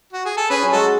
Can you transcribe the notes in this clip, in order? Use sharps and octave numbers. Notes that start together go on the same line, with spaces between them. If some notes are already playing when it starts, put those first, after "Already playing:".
F#4
G#4
A4
C#4 G#4 B4
F#3
G#3 F#4 A4